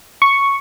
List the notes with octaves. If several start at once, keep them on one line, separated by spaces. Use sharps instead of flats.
C#6